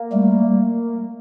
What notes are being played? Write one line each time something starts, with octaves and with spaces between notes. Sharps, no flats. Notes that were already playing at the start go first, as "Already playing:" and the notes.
Already playing: A#3
G3 A3